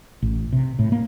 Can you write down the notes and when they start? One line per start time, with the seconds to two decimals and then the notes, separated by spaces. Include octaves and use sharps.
0.22 A1
0.53 C3
0.79 A2
0.92 A#3